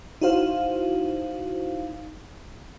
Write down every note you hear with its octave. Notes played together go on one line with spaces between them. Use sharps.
D#4 E4 F#4 C5 F5